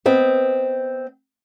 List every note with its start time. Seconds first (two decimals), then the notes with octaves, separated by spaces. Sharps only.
0.06 B3 C4 D#5